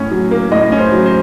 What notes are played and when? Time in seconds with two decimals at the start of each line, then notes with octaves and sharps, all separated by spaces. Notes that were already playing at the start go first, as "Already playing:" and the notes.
Already playing: A2 C#4
0.11 F#3
0.31 A#3
0.52 A2 D#5
0.72 C#4
0.78 C5
0.92 F#3
1.06 C5